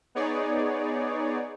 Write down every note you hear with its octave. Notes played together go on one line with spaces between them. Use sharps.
B3 D#4 G#4 C#5 D5